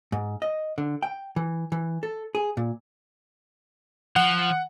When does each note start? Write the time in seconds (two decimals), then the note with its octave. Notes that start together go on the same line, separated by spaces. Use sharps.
0.12 G#2
0.42 D#5
0.78 D3
1.03 G5
1.36 E3
1.72 E3
2.03 A4
2.35 G#4
2.57 A#2
4.16 F3 F#5